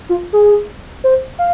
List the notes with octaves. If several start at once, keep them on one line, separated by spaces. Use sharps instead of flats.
F4
G#4
C5
F5